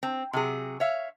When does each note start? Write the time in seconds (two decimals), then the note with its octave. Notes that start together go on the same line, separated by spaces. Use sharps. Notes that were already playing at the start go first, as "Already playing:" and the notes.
0.03 C4
0.33 C3 F#3 G#4
0.80 C#5 E5 F5